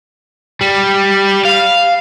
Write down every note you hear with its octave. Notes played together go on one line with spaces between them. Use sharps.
G3
F5